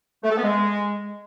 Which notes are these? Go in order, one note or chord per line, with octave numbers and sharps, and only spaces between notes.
A3
A4
B3
G#3